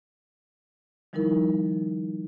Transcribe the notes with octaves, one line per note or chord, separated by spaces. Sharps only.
D#3 F3 G3 D#4 E4 A#4